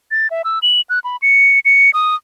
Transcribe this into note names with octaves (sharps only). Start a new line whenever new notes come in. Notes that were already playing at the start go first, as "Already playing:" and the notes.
A6
E5
E6
F#7
F#6
B5
C#7
C#7
D#6